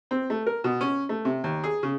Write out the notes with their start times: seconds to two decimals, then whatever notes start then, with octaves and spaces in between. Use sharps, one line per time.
0.11 C4
0.30 A3
0.46 A#4
0.64 B2
0.81 C#4
1.09 A3
1.25 C3
1.44 D#2
1.64 G#4
1.83 C#3